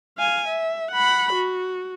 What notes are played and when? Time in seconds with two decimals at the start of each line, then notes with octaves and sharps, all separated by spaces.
0.18 F5 G#5
0.48 E5
0.91 F#5 B5
1.33 F#4